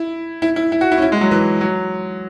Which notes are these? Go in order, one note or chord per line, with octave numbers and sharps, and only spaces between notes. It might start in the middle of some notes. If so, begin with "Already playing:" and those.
Already playing: E4
E4
E4
E4
F#4
E4
C#4
E4
G#3
F#3
E3
F#3